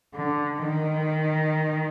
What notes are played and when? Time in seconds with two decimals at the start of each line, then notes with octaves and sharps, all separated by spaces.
0.14 D3
0.61 D#3